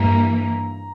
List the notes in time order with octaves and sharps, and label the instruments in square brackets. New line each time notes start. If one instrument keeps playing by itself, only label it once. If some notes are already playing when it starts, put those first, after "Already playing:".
Already playing: [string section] G2 E3 A#3 [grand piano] A#5